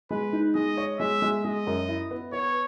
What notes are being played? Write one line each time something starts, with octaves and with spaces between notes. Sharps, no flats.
G#3 B4
D#4
G#3 D#5
C#5
G#3 E5
G#3
G#3 D#5
F#2
E4
B3
B3 C#5